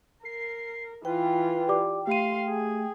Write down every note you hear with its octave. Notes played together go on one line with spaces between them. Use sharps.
A#4 C7
E3 F4 B4 G5
G4 D5 D6
A3 G4 F5 C6 D#7
G#4